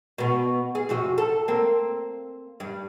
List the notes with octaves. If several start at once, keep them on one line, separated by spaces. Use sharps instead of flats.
B2 B3
G#4
F2 C3 F#4
A4
A#3 C4
G2